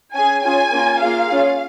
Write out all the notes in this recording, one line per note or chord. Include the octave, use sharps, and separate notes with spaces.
C#4 G#4 G#5
C#4 F4 G#4 G#5
A#3 C#4 F4
A#3 F4 G#4 F5
C#4 F4 G#4